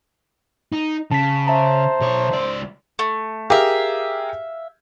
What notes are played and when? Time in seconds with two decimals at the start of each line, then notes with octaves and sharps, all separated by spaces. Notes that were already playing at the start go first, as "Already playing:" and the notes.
0.72 D#4
1.11 C#3 A5 B6
1.47 C5 E5 A5 A#5
2.01 B1 C#5
2.31 C#2 D5
2.99 A3
3.50 G4 G#4 A#4 E5 F5